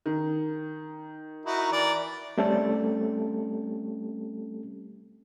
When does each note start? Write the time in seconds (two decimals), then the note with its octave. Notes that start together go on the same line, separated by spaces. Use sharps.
0.06 D#3
1.46 D#4 E4 F#4
1.72 E3 A#4 D5
2.38 G3 A3 C4 C#4 G4 A4